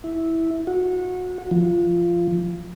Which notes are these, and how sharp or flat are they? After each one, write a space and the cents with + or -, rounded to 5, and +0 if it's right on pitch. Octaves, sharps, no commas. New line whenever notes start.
E4 -10
F#4 -25
F3 -15